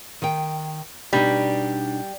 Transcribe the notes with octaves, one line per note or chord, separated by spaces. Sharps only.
D#3 G5
B2 G3 D4 D#4